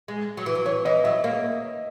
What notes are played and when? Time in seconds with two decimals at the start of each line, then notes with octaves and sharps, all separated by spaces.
0.08 G#3
0.37 F#3
0.46 E3
0.55 F#3
0.66 E3 C#5
0.85 E3 D#5
1.04 F#3 E5
1.24 A#3